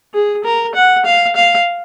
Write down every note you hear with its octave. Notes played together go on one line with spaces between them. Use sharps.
G#4
A#4
F#5
F5
F5